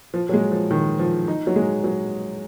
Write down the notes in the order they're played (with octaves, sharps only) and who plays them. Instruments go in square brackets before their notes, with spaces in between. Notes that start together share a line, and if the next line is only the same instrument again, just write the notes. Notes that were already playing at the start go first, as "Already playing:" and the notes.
[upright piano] F3
F#3
G#3
F3
D#3
F3
D#4
F#3
G#3
F#3